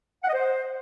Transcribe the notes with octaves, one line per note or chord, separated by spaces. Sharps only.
F#5
D#5
C5